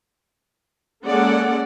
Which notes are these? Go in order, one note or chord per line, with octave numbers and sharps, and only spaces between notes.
G#3 A#3 C#4 A4 D5 F#5